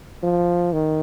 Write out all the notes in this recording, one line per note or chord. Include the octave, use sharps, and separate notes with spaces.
F3
D#3